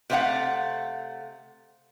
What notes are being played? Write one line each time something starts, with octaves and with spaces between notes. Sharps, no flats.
C3 A3 B3 D4 F5 F#5